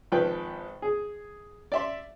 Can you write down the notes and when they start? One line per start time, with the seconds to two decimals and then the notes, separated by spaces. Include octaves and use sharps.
0.12 G#1 F3 B4 G5
0.82 G#4
1.72 D5 E5 C6